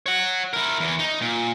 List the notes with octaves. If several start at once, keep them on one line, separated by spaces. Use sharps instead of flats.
C#5 F#5
E4 A#4
E2 E3
D#4
A#2